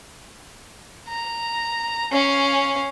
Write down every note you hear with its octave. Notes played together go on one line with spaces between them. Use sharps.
A#5
C#4 F5